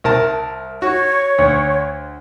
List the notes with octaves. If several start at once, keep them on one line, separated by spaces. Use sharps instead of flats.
C2 A#4 A5
F#4 C#5
D2